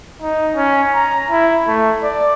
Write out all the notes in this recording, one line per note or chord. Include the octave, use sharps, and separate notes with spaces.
D#4
C#4
A#5
E4
A3
D5